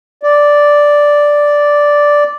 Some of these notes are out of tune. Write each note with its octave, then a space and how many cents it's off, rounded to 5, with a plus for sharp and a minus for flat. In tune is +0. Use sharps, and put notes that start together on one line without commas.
D5 -5